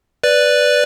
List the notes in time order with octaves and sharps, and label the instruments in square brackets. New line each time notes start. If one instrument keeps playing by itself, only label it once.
[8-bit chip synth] B4 D5